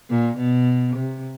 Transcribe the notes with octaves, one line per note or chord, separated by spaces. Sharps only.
A#2
B2
C3